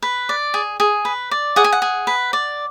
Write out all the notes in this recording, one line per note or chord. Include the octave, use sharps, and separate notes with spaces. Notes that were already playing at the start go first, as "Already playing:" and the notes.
B4
D5
G#4
G#4
B4
D5
G#4 F#5
G#5
F#5
G#4
B4
D5